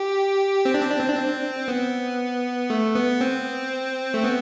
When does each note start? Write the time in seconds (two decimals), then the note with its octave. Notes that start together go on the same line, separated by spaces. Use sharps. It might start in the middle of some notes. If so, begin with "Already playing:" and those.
Already playing: G4
0.65 C4
0.74 D4
0.82 C4
0.91 D4
0.99 C4
1.09 D4
1.17 C4
1.68 B3
2.70 A3
2.95 B3
3.21 C4
4.14 A3
4.24 B3